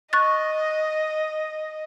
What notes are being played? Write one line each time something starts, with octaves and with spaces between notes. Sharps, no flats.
D#5 C#6 F#6 A6